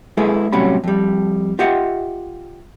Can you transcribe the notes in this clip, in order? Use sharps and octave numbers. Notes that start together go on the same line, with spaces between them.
G#3 E4 G#4 A4 B4
A2 C3 F#3 G3 C#4 B5
F2 G3
F4 G4 D#5 E5 F#5